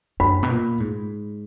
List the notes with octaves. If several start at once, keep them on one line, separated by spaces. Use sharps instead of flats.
F#2 B5
B2
A#2
G#2